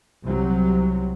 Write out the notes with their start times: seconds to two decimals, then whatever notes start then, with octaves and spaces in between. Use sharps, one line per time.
0.23 C2 C3 F#3